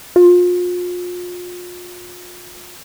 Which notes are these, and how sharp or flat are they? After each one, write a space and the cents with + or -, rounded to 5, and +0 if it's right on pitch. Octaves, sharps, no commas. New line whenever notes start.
F4 +35